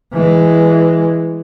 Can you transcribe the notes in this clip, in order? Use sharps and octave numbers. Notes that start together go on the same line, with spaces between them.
E3 G#3